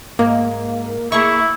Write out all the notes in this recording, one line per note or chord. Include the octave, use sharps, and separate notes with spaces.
G#2 A#3
A#3 E4 G#4 E5 C#6